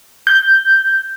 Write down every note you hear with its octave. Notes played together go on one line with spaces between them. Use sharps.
G6